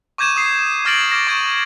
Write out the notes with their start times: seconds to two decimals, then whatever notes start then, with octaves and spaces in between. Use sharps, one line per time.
0.18 C#6 D6 G6 G#6 D#7 E7
0.36 D#6 C7
0.85 D6 F6 A6 A#6 D7 F#7
1.11 D6 F6 G#6 A#6
1.27 C#6 G#6 D#7